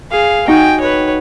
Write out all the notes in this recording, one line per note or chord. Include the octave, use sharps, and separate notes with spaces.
G#4 F5
D#4 F#4 G5 G#5
B4 C#5